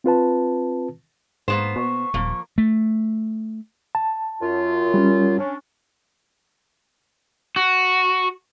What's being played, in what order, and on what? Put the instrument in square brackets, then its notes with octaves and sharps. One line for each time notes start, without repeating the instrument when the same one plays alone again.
[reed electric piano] C4 F4 B4 A5
[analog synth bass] G#2 [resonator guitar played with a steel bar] A#3 B3 C5
[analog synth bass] B2 [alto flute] C#6
[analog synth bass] D#1 [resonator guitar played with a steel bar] F3 A#3
[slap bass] A3
[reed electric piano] A5
[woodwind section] F#2 F4
[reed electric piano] G3 C#4
[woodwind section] C#4 D4
[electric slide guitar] F#4